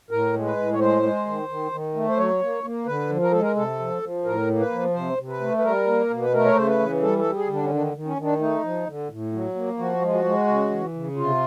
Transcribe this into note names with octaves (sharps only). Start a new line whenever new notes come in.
A2 A#4
G#3
B4
A2
C#5
G#3 C5
G#3
D#3
D#3
D#3
A3
C5
F#3 C#5
A#3
A#3
D3 B4
F3
A#4
G#3 A4
A#4
C3 A4
F3
F3
A2 A#4
A#3
B4
F3
C3 C5
C3
B4
A3
B4
G3 A#4
A#3
B2
B4
A3 A#4
C#5
C#3 C5
B4
E3
G3 A4
A4
G3
G#4
D3
D4
C#4
D#3 D4
D#3
C#4
D#3
D4
A3 D#4
F3
D3
A2
F#3
A#3
F3 F#4
G#3
F#4
G#3
C#3
E3
C#3
C3 F4